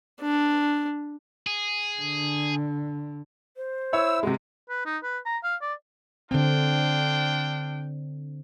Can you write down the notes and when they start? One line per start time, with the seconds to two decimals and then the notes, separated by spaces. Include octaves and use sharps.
0.21 D4
1.47 G#4
2.00 D3
3.57 C5
3.93 E4 C#5 E6
4.23 C3 G#3 F#4
4.69 B4
4.86 D#4
5.03 B4
5.26 A#5
5.44 F5
5.62 D5
6.31 D3 C4 D4 F4 G5